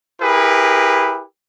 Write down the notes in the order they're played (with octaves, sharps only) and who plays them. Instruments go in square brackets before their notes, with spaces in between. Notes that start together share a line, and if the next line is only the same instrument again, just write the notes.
[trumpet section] E4 G4 G#4 A#4 B4